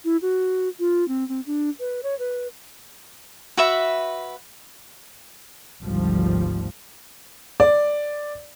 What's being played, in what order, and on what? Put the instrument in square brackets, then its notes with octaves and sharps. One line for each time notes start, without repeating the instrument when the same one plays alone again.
[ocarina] E4
F#4
F4
C4
C4
D4
B4
C#5
B4
[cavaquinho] F#4 B4 E5 B5
[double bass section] G#1 D2 F3 G3
[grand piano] D5